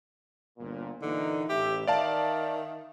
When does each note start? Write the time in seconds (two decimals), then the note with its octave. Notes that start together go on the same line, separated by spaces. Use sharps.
0.58 G1 A#2
1.02 A#2 D3 E3 D#4
1.49 A1 G4 E5
1.87 D#3 D5 E5 F5 A5